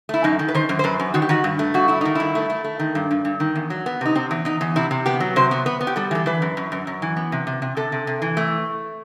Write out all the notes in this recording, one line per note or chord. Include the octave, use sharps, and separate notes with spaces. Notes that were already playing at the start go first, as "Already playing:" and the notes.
A3 E4
F#2 D#4
D#3
B4
D#3 C5
F#2
C5
F#2 B4
F#2
D#3 F#4
G4
D#3 F#4
G2
A3
G2 F#4
A3 E4
D#3 D#4
G2 E4
A3
A3
A3
D#3
G2
G2
G2
D#3
E2
F#3
B3
C3 D#4
C3 C4
E2
E2 D#4
E2
C3 E4
C3
B3 G4
F#3
C3 C5
B3
B3 B4
B3
G4
G3 A4
E3 A4
E3 B4
F#2
F#2
F#2
F#2
E3
B3
C3
C3
C3
C3 A4
C3
C3
E3
A3